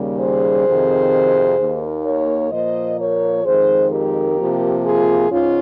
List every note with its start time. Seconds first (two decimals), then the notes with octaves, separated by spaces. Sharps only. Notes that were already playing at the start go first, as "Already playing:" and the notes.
Already playing: D#2 C#3 G3 A#3
0.18 G#4 C5
0.65 F2 C3 D#3
1.58 D#2 D#3 A#3
2.05 A#4 C#5
2.51 A#2 F3 A#3 C5 D#5
2.98 A#4 C#5
3.45 F2 D#3 G#3 G#4 C5
3.91 G4 A#4
4.38 C3 F3 A#3
4.84 F4 G#4
5.31 G#2 C#4 F4